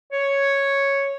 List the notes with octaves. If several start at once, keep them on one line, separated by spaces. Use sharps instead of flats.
C#5